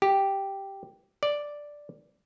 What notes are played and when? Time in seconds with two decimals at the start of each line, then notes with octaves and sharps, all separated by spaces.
0.02 G4
1.23 D5